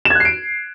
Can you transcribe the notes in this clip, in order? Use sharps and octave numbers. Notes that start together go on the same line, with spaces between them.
F#6 G#6 C7 D7 E7